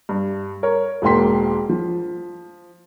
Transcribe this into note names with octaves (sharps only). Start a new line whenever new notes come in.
G2
A#4 C#5
E1 G#2 A#3 G5 C6 B6
F3